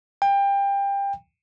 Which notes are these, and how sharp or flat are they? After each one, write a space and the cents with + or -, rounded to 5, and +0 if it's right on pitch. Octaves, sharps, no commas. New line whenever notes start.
G5 +25